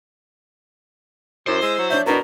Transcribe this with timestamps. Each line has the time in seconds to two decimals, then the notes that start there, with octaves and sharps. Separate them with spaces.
1.47 F#2 E4 C5
1.62 G#3 E6
1.79 F#3
1.90 D4 C#5 E5 G6
2.06 B2 B3 D4 A#4